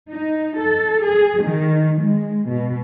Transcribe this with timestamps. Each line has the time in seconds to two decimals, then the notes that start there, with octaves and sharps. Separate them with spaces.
0.13 D#4
0.60 A4
1.06 G#4
1.43 D#3
2.01 G#3
2.49 B2